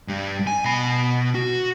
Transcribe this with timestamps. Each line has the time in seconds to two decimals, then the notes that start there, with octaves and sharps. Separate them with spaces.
0.08 G2 G3
0.47 G#5
0.64 B2 B5
1.35 F#4